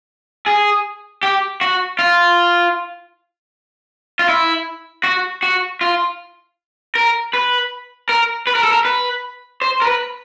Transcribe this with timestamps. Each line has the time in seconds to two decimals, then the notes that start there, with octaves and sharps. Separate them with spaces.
0.46 G#4
1.23 G4
1.61 F#4
1.99 F4
4.19 F4
4.29 E4
5.04 F#4
5.43 F#4
5.81 F4
6.95 A#4
7.34 B4
8.09 A#4
8.47 B4
8.55 A#4
8.63 A4
8.72 A#4
8.85 B4
9.62 C5
9.82 A#4
9.86 B4